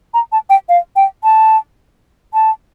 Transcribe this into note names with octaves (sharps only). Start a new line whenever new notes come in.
A#5
A5
G5
F5
G5
A5
A5